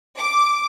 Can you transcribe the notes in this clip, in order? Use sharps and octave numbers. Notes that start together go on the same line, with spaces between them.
D6